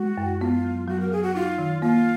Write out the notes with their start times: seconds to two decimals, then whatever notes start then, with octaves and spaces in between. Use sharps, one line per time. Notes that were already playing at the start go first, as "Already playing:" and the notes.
Already playing: G#3 F#4
0.17 F#2
0.40 B3 F4
0.64 F#3
0.88 F#3 F#4
1.00 A#4
1.12 F#3 G#4
1.23 F#4
1.35 D#4 F4
1.58 D#3
1.82 A#3 F4